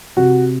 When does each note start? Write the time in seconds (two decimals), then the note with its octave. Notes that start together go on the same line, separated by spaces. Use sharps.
0.17 C3 F#4